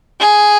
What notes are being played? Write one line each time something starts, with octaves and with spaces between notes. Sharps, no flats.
G#4